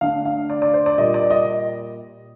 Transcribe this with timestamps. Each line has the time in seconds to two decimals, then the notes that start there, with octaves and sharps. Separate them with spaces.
0.01 D3 A3 D4 F5
0.25 F5
0.50 D5
0.62 D5
0.74 C5
0.86 D5
0.98 A#2 G3 A#3 D#5
1.14 D5
1.30 D#5